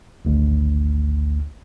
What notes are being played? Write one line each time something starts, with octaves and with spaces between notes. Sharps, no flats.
G#1 D2